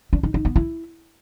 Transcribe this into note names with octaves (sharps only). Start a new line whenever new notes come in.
D4
D#4
D#4
B3
E4